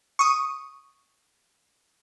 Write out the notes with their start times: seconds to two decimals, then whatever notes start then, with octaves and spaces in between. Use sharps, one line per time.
0.19 C#6 D#6